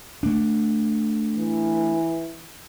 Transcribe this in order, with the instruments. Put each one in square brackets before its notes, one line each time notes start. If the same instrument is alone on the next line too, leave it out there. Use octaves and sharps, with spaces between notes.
[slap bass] A3 D4
[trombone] E3